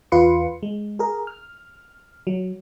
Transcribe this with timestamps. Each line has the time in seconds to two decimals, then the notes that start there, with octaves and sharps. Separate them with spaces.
0.12 E2 F4 B4 C6 C#7
0.63 G#3
0.99 G#4 A#4
1.27 F6
2.27 F#3